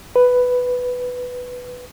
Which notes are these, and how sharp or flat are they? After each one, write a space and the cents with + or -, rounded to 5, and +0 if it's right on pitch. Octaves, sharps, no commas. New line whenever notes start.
B4 +5